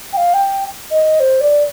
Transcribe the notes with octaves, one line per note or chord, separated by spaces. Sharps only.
G5
F5
G5
D#5
C5
D5